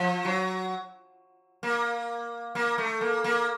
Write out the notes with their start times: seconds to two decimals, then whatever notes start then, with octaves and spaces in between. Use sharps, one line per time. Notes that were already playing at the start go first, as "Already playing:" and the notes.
Already playing: F3
0.25 F#3
1.63 A#3
2.55 A#3
2.78 A3
3.01 A#3
3.24 A#3